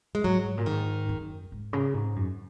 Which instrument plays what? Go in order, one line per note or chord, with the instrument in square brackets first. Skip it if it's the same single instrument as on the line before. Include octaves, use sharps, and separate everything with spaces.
[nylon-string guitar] G#3
[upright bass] G#2 [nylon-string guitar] F#3
[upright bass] A#2
[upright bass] G#2 [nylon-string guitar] D#3
[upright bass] F#2
G#2
C#3
G#2
F#2